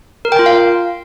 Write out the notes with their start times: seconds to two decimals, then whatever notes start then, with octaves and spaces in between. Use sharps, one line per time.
0.25 A#4
0.32 G5
0.39 F4
0.46 F5